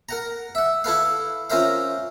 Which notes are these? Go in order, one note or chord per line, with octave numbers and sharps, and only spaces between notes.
A#4 F#5 A#5
E5 F#5
E4 A4 B4 F5
C#4 F4 A#4 C5 E5 F5